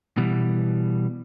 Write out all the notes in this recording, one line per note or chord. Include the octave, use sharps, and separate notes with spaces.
B2 E3 G3